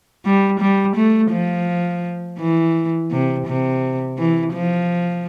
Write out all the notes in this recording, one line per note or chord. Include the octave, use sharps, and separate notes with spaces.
G3
G3
A3
F3
E3
C3
C3
E3
F3